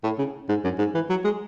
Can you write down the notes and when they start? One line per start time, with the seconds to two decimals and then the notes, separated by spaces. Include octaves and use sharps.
0.04 A2
0.18 C#3
0.49 G#2
0.64 F#2
0.78 G#2
0.94 E3
1.10 F#3
1.24 G#3